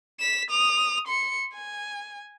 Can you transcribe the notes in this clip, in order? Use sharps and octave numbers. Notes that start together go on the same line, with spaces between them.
B6 E7
D#6 F7
C6 C#7
G#5